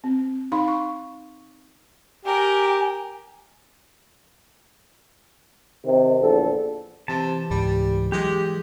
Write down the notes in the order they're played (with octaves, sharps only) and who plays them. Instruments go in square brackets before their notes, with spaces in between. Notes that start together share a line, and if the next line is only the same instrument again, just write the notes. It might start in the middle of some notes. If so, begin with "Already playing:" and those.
[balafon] C4
D#4 F5 B5 C6
C#6
[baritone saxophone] G4 [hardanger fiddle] A#4 [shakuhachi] G#5
[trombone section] C3 D#3
A#1 E2 D3 A4
[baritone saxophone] C3 [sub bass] E3 [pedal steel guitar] A5
[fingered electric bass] C#2 G#2 [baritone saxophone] G3
[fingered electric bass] F#3 [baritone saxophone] G#3 [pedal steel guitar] G4